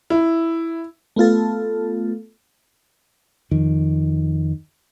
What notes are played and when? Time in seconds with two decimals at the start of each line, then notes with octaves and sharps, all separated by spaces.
0.10 E4
1.16 A3 B3 F4 A4
3.51 F2 D#3